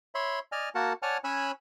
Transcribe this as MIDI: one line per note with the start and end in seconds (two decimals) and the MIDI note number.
0.15 0.39 73
0.15 0.39 76
0.15 0.39 83
0.15 0.39 84
0.52 0.69 74
0.52 0.69 75
0.52 0.69 80
0.52 0.69 89
0.75 0.93 58
0.75 0.93 66
0.75 0.93 70
0.75 0.93 78
0.75 0.93 81
1.02 1.18 73
1.02 1.18 74
1.02 1.18 78
1.02 1.18 80
1.02 1.18 81
1.02 1.18 89
1.24 1.51 61
1.24 1.51 73
1.24 1.51 80
1.24 1.51 83
1.24 1.51 88
1.24 1.51 90